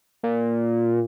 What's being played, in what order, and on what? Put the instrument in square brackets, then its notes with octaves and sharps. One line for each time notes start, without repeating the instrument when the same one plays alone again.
[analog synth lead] A#2